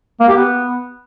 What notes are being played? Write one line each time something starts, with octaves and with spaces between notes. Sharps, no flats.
A#3
G4
B3